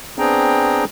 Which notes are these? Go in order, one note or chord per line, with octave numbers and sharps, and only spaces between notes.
B3 C4 D4 G#4 G5 A#5